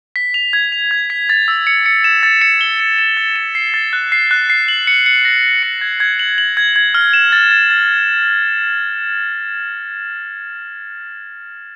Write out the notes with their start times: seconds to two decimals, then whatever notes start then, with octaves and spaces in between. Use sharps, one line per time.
0.16 B6
0.34 F7
0.53 G#6
0.72 F7
0.91 G#6
1.10 B6
1.29 A6
1.48 E6
1.67 C#7
1.86 C#7
2.04 E7
2.23 A6
2.41 C#7
2.61 G7
2.80 C#7
2.99 E7
3.17 A6
3.36 E7
3.55 C7
3.74 A6
3.93 F#6
4.12 C7
4.31 F#6
4.50 C7
4.68 F#7
4.87 C#7
5.06 C#7
5.25 A#6
5.43 A#6
5.63 C#7
5.81 G#6
6.00 G#6
6.19 F#7
6.38 F#7
6.57 G#6
6.76 G#6
6.95 F6
7.13 E7
7.32 A6
7.51 A6
7.70 A6